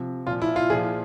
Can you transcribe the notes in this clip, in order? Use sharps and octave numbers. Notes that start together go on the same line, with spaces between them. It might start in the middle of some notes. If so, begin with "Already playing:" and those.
Already playing: C3 F3
A#2 F3 F4
E4
F4
A#2 F3 G#4